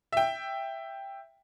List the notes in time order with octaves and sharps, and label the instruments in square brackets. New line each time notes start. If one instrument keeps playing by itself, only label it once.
[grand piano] E5 G5